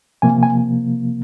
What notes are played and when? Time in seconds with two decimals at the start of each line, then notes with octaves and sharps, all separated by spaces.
0.22 C3 F3 A#3 G#5
0.43 G#5